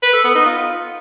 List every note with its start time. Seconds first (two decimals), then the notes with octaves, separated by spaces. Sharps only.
0.03 B4
0.13 A4
0.24 B3
0.35 D#4
0.46 F4